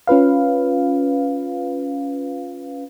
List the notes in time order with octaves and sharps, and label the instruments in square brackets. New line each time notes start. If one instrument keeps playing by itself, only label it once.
[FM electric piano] C#4 F4 B4 F5